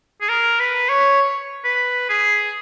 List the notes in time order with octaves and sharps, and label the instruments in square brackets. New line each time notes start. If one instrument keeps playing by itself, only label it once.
[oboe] G#4
A#4
B4
C#5
B4
G#4